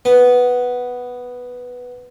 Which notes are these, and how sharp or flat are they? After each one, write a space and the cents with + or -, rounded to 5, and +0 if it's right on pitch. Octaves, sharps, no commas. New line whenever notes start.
B3 +0